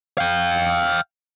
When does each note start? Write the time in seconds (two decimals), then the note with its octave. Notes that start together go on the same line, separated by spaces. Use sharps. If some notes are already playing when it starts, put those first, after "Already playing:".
0.18 F5 G5